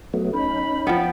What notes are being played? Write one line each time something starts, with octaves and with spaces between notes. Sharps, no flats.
F#3 A3 B3
C#4 D#4 B5
F3 B3 G5